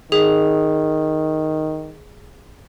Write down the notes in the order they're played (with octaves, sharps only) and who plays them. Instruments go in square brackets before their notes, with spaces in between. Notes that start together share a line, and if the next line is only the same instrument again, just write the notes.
[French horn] D#3 [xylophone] G#4